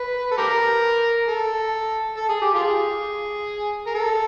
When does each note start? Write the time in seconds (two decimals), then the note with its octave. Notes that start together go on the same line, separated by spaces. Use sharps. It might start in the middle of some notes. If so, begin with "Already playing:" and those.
Already playing: B4
0.31 A4
0.38 G4 A#4
1.28 A4
2.17 A4
2.29 G#4
2.42 G4
2.54 F4 G#4
3.86 A#4
3.95 A4